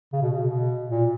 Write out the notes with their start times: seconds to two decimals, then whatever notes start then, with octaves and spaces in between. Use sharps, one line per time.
0.13 C#3
0.22 B2
0.33 C#3
0.41 B2
0.90 A#2